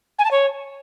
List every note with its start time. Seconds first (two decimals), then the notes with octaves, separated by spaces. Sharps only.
0.18 G#5
0.25 A5
0.31 C#5